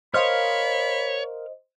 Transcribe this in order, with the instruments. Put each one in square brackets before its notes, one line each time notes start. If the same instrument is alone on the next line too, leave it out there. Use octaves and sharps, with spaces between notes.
[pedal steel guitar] A#4 F5 F6 [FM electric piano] C5 D#5 [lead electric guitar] C#5 [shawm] B5